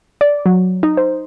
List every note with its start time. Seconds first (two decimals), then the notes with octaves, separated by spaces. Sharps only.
0.21 D5
0.46 F#3
0.83 D#4
0.97 C5